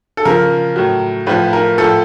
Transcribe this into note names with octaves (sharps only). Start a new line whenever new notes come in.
A4
C#3 F3 A#4
A2 F#3
A2 F3 B4
A#4
A2 F3 A4